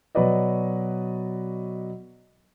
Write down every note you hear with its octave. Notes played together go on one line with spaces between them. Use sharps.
B2 F#3 F#4 B4 D5 D#5